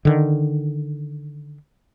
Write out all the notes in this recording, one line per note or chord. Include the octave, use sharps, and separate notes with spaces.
D3 D#3